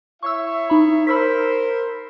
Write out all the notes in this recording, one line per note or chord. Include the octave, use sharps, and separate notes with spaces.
E4 C#5 E5 C#6 E6
D#4 B5
A#4 C5 B5 E6 B6